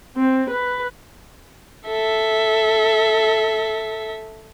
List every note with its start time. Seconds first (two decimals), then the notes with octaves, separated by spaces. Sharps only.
0.17 C4
0.50 B4
1.88 A4 E5